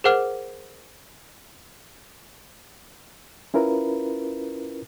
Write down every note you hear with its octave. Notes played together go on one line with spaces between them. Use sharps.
G#4 A#4 C5 F#5 D6 F6
C#4 E4 F4 A#4 B4